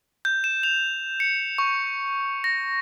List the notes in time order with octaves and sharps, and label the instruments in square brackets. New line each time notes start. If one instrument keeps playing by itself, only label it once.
[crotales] G6
E7
F7
C#7
C#6
A#6